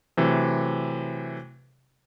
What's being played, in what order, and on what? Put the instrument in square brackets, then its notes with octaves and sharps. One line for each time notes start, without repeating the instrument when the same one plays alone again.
[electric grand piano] C3 E3 F#3 A3